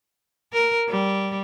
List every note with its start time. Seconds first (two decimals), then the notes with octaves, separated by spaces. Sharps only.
0.53 A#4
0.89 G3